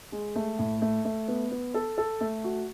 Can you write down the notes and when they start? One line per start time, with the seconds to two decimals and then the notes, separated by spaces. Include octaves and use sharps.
0.12 G#3
0.36 A3
0.59 A2
0.82 A3
1.05 A3
1.28 B3
1.51 B3
1.74 A4
1.98 A4
2.21 A3
2.44 F#4